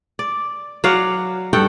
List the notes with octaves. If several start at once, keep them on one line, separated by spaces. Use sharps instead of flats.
D5
F#3 D5 F5 F#5
G2 A4 F#5 G5